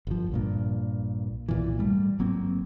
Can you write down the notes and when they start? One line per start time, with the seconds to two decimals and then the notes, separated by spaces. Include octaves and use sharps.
0.07 G1 F3
0.32 A#1 G2 A#2
1.48 B1 A#2 E3
1.79 G#2 G3 A3
2.19 G1 F#3 A#3 C4